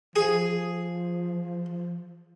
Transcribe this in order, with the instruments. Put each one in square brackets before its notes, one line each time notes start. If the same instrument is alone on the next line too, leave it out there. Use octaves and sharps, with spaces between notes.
[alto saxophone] F3 [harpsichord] G#4